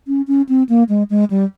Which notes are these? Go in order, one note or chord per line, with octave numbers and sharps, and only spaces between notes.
C#4
C#4
C4
A#3
G#3
G#3
G3